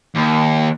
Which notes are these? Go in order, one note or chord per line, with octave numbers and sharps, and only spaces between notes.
D#2